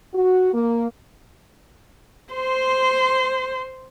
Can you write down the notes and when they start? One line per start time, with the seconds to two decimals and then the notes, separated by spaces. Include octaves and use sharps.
0.14 F#4
0.54 A#3
2.34 C5 C6